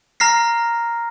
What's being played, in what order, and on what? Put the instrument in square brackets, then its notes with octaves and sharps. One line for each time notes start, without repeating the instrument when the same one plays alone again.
[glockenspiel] A#5 F6 A#6 C7